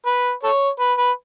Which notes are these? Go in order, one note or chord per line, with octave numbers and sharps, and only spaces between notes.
B4
A4 C#5
B4
B4